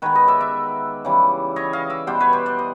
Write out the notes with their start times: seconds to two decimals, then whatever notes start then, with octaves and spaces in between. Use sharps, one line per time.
0.02 D#3 G#3 B3 B4 C#5
0.15 C#5 D#5
0.28 D5 E5
0.41 D5 E5
1.05 C#3 E3 G3
1.56 C#5 D#5
1.73 D#5 F5
1.90 D5 E5
2.07 B2 G3 B3 C5 D5
2.20 B4 C#5
2.33 C5 D5
2.46 C5 D5
2.59 D#5